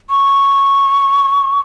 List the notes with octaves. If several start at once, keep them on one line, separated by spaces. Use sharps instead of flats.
C#6